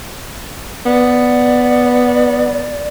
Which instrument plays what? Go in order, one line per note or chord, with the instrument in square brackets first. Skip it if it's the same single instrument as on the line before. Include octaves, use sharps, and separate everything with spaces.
[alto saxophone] B3 [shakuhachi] D5